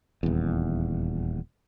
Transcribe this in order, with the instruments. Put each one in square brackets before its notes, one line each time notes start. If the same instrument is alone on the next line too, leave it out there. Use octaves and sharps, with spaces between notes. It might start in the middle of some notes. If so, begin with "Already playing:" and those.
[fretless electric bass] D#1 E2